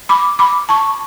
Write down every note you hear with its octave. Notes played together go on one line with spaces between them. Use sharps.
B5 D6
B5 D6
A5 C#6